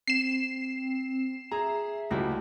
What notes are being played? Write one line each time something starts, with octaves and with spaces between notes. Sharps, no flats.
C4 C7 E7
G#4 E5 A#5
C#2 F#3 G3 A3 E4